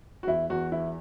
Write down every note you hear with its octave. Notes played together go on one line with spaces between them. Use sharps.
F#4
E2 E4
E2 F#4
E3 E4